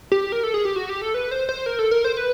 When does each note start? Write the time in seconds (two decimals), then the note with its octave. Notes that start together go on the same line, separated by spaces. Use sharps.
0.12 G4
0.32 A#4
0.44 A4
0.54 G#4
0.65 G4
0.76 F#4
0.89 G4
1.02 A4
1.14 B4
1.31 C5
1.49 C5
1.66 A#4
1.79 A4
1.91 A#4
2.04 C5
2.17 B4